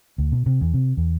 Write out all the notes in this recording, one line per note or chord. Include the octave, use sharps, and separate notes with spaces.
D2
B2
C3
E2
C3
E2